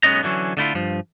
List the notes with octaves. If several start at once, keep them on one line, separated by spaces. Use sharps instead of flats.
B1 G#3 B3 C#4 D#5 A#5
D3 E3 F#3 C#4
D3 A3 E4 F4
G2 F3